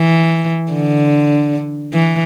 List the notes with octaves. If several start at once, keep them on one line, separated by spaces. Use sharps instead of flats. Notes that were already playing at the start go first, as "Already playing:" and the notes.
Already playing: E3
D3
E3